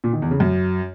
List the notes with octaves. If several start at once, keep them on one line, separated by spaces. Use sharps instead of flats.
A#2
D#3
E2
C#3
F#2